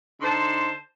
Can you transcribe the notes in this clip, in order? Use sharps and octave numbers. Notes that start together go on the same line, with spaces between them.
D3 D#4 C5 A5 C6